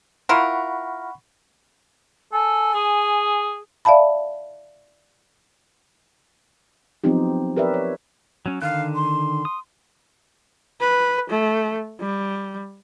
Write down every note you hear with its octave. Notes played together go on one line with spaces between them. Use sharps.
E4 F4 A#4 F#5 B5 C#6
A4 G#5
G#4
D5 E5 F5 A5 B5
F3 F#3 B3 C4 D#4 G4
G4 A#4 B4 D5 E5
C#5
F#3 C#4
D3 D#3 F5 F#6
C6
D#6
B4
A3
G3